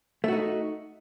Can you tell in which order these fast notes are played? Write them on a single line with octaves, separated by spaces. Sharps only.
A3 F#4 D#4